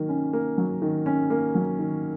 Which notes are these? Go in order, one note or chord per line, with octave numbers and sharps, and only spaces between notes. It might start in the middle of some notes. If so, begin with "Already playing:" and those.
Already playing: D#3 F#3 A#3
C#4
A#3
F#3
D#3
C#4
A#3
F#3
D#3